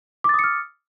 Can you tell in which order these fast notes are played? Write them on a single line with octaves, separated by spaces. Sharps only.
D6 A6 D#6 C#7 F6